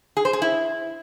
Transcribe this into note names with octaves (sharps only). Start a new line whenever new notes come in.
G#4
C5
G#4
E4